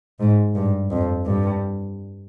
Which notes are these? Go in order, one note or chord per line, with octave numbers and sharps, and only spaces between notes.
G#2
G2
F2
G2